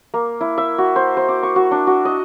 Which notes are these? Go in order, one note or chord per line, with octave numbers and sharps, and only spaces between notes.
A#3
E4
E5
F#4
C5
C5
D6
C#6
F#4
D4
F#4
D#5